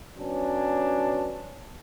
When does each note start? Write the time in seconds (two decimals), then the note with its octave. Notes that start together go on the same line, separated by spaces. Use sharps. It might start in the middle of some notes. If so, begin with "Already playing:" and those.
0.19 F#3 B3 C#4 D4